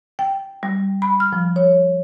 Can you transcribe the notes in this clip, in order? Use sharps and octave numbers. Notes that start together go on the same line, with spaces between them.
G5
G3
B5
F6
F3
C#5